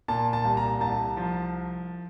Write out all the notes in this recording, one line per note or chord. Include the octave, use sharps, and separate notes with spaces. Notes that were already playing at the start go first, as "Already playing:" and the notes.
A#2 A5
A5
C2
A#5
C2 A5
F3